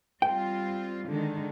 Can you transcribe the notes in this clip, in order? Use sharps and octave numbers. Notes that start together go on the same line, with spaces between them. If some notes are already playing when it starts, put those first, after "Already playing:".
G3 C4 F4 G5
D3 D#3 G#3